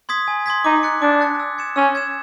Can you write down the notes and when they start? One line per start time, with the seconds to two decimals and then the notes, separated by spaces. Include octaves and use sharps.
0.09 C6 D#6 G#6 B6
0.28 G#5
0.46 C6 D#6 G#6 B6
0.64 D#4 D6
0.83 F#6 A6 C#7
1.02 D4 D6
1.21 F#6 A6 C#7
1.40 E6
1.58 G#6 C#7 E7
1.76 C#4 E6
1.95 G#6 C#7 E7